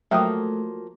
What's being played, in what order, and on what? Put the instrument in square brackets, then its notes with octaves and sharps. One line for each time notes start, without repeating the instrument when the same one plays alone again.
[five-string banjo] F3 F#3 A#3 [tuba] A3 [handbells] E5 G5 D#6